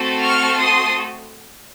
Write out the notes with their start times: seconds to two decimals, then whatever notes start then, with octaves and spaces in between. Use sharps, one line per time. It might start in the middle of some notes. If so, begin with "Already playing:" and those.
Already playing: A3 C4 F#4 A4
0.22 C#6 F6
0.58 C6 D#6